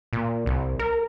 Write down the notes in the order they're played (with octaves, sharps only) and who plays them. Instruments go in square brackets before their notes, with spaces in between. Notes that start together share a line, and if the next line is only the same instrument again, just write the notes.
[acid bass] A#2
C2
A#4